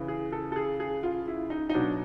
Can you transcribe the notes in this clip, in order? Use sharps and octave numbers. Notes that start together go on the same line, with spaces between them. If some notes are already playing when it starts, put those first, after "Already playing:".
Already playing: C#3 E3
G#4
A4
A4
G#4
G#4
F4
E4
D#4
D#4
B2 F#3 D4